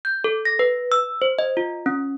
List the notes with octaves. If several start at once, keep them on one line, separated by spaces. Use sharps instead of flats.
G6
A4
A#6
B4
E6
C5
D#5
F4
C#4